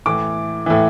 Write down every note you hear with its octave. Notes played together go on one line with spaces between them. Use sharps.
A2 E3 D6
A2 E3